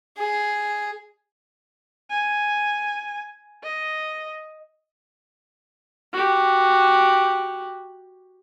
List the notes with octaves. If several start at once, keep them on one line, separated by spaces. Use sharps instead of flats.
G#4
G#5
D#5
F#4 G4